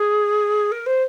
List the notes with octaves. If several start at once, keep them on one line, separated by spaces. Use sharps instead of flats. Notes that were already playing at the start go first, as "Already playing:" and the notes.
Already playing: G#4
A#4
C5